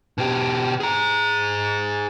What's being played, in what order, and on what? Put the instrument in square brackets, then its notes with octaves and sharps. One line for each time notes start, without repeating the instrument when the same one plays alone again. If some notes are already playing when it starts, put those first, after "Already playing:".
[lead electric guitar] B2 G4
G#4 A#5